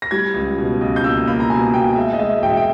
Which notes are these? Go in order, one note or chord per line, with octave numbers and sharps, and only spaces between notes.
A#6
G3 G#6
C#2
B2
C#2
G6
A#3 E6
A#3 B5
A#5
B2 G#5
B2 G5
G#3 E5
D#5
G#3 E5
E1 G5
E5
G5